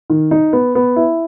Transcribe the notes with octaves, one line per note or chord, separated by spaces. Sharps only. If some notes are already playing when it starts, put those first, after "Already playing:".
D#3
D#4
B3
B3
E4